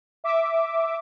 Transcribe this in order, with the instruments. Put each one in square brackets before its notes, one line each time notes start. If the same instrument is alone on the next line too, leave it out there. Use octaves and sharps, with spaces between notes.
[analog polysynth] E5 D6